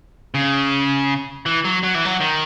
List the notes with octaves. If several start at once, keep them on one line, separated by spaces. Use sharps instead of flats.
C#3
E3
F#3
F#3
E3
F#3
D#3